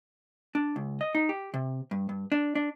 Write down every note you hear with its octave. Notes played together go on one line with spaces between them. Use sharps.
D4
C#2
D#5
D#4
G4
C3
G2
G2
D4
D4